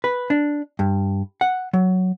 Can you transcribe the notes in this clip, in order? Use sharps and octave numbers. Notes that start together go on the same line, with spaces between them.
B4
D4
G2
F#5
F#3